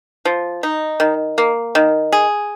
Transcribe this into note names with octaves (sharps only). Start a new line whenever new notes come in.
F3
D#4
D#3
A#3
D#3
G#4